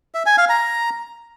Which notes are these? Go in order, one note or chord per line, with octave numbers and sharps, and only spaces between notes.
E5
G#5
F5
A#5